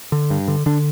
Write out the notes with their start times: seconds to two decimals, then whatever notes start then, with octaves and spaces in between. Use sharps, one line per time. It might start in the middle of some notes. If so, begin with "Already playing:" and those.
0.12 D3
0.30 G2
0.48 D3
0.66 D3 D4